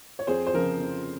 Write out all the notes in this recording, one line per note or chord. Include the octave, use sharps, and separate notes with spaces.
C#5
F2 G#4 C5
C5
C#3 F3 A#4
F2